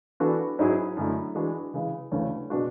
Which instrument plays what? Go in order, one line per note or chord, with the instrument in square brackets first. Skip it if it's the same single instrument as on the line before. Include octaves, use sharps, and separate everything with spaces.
[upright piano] E3 B3 D4 F#4 A4
G#2 F#3 C#4 E4 G#4
F#2 D3 A3 E4
E3 G#3 D4 F#4
C#3 E3 G#3
D2 C#3 E3 A3 C#4
B2 G#3 D4 F#4